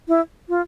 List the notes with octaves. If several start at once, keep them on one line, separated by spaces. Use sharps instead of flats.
E4
F4